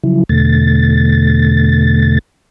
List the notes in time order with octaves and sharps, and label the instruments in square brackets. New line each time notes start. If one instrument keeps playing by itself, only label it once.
[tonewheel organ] C#3 F3 F#3 E4
E2 B2 D3 A3 A6